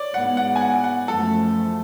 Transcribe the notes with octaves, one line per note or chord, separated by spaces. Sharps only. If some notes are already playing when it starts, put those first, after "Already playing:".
Already playing: C#5 D5
G#2 G#3 B3 F#5
F#5
G#5
F#5
F#5
F#2 F3 A3 A4